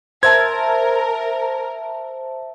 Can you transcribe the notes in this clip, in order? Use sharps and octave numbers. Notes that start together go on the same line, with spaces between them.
A#4 C5 E5 A5 G#6